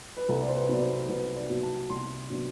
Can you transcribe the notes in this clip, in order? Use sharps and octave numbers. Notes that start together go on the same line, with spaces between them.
B4
C2 A4
D5
C5
B4
B2 F#3 B3 D5
C5
C2 B4
D5
B2 F#3 B3
A5
C2 C6
C3 F#3 B3 D4